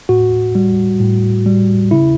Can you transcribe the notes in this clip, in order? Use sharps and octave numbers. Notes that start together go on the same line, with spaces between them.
A2 F#4
G3
A2
G3
C#3 E4